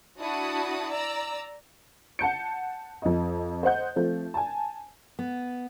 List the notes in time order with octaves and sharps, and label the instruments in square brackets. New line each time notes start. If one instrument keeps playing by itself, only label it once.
[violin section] D4 E4 F#4 A5 D#6
D5 A#5 E6
[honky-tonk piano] F#5 A5 G6 C#7
F2 D#5
C5 D#5 F#5 G6
F3 A3 C4
G#5 A5
[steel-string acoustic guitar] B3